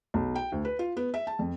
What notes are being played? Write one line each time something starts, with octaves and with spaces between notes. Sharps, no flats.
B1
G5
D2
B4
F4
B3
E5
A5
F2